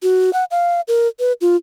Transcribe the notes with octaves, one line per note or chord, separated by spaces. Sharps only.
F#4
F#5
F5
A#4
B4
F4